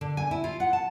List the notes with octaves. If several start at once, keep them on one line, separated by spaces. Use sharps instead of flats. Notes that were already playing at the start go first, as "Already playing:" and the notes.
D3
G#5
E4
F4
F#5
A5